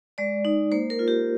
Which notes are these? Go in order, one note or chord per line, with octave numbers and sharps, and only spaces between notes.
G#3 D5
D#4
A#3 C5
A#4
F4
G4